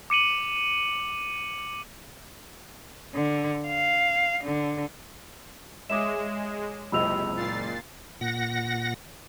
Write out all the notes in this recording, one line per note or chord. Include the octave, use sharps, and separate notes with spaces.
D6 C#7 D#7 F#7
D3
F5
D3
G#3 C#5 E5 D6 D#6 E7
F#1 C#2 C3 D#5 B5 E6 F7
A#2 A6 C7
A#2 F#5 A#6